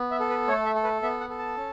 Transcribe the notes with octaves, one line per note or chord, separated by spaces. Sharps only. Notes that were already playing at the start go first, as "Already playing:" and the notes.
Already playing: B3
E5
A4
B4
A3 C#5
E5
A4
B4
B3 E5
F#5
A4
A5
C#4